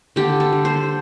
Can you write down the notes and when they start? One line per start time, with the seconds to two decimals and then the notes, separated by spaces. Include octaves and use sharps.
0.16 D3 G4
0.40 A4
0.53 G3
0.65 C5